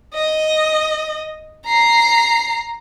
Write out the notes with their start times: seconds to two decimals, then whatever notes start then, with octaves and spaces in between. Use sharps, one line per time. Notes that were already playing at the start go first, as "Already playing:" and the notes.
0.15 D#5
1.66 A#5 C7